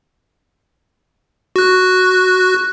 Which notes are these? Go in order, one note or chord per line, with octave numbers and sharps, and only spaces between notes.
F#4 F#6